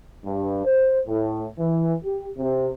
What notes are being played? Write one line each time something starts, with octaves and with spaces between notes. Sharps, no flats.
G2
C5
A2
E3
G4
C3